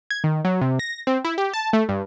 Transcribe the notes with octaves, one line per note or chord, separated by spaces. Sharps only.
G#6
D#3
F#3
C3
A#6
C4
E4
G4
A5
A3
G2